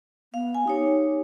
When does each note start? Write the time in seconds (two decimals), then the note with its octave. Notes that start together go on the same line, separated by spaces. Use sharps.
0.34 B3 F5
0.54 G#5
0.68 D#4 G4 C#5